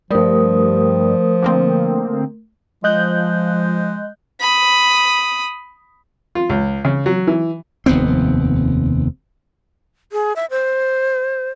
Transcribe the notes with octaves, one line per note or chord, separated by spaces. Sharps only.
G2 F3 G3 A3 A#4 D#6
D3 A#3 C4
F3 G#3 D#5 F#6 G6
B5 D#6
F4
C#2
C#3
F#3
E3
F1 D#2 B3 C4
G#4
E5
C5